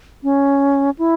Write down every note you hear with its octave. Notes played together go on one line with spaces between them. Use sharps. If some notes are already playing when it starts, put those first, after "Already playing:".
C#4
E4